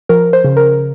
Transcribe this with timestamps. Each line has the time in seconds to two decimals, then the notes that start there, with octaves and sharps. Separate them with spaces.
0.09 F3 A#4
0.33 C5
0.44 C#3
0.57 A#4